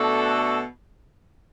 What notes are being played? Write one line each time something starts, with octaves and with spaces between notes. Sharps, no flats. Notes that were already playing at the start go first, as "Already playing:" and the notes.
Already playing: B2 A3 D4 F#4 A4